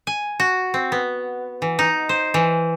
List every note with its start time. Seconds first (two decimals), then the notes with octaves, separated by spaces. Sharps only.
0.07 G#5
0.40 F#4
0.74 C4
0.92 B3
1.62 E3
1.79 D#4
2.09 C5
2.34 E3